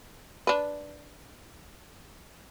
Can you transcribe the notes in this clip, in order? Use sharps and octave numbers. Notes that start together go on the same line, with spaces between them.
D4 B4